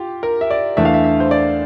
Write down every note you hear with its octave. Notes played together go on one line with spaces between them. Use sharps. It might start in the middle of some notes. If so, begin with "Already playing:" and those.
Already playing: F4 G4
A#4
E5
D5
E2 E3 A3 D4 E5
F5
E5
E5
C5
D5